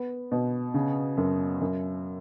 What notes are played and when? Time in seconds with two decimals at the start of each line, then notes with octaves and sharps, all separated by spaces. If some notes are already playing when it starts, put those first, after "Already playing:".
Already playing: B3
0.32 B2
0.74 C#3
1.17 F#2
1.61 F#2